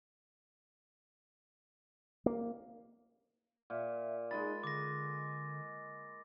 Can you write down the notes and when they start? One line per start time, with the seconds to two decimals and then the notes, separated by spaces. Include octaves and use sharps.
2.26 A#3
3.70 A#2 E5
4.31 G#3 D#4 D#5 B5 A6
4.63 D3 D6 A#6